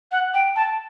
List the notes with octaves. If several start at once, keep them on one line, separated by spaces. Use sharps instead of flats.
F#5
G5
A5